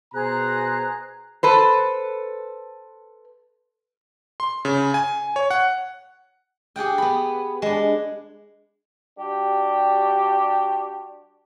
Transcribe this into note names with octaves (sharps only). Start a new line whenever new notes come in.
B2 G#4 C5 A#5 F#6
A4 B4 C5
C6
C#3
G#5
C#5
F#5
G4 G#4 F#5 G5
B3 B5
G#3 D4
G3 D4 F#4 G4